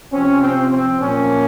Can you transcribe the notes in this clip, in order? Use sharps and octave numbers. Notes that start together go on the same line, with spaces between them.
C3 F3 C4 C#4
C4
C4
A#2 F3 A#3 C#4